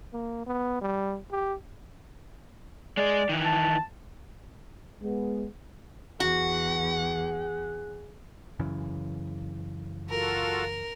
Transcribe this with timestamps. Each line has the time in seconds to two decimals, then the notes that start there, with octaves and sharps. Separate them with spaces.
0.13 A#3
0.46 B3
0.81 G3
1.31 G4
2.97 G#3 G#4 D5
3.29 D#3 E3
3.44 A5
5.02 G#3 B3
6.20 E2 F#4 G#4 F#5
8.59 F#2 C#3 E3
10.09 F4 F#4 A4 A#4